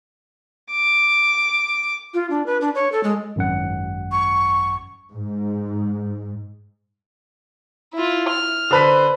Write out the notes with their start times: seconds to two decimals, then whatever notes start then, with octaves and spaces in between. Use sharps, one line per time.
0.72 D6
2.14 F4
2.30 D4
2.46 B4
2.61 D4
2.75 C#5
2.92 A4
3.04 G#3
3.36 G#1 F#2 F#5
4.12 C#6
5.11 G#2
7.94 E4 F4
8.30 F6
8.71 D3 B4 C5 B6